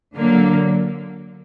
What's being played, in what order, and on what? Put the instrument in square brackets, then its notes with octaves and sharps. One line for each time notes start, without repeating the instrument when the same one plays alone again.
[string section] D3 F#3 A#3